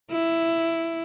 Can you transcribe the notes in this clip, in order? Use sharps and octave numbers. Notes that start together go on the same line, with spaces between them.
E4